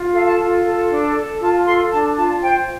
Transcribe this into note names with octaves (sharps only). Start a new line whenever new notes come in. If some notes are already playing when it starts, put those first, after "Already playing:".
Already playing: F4
A4 F5
A5
F4
A4
D4
A4
F4 A5
A4 C6
D4 A5
F4 A5
C5 G5